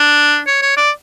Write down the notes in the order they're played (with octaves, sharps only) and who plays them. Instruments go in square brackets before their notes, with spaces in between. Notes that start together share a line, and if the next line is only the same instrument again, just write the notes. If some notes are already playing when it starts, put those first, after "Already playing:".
Already playing: [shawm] D4
C#5
C#5
D5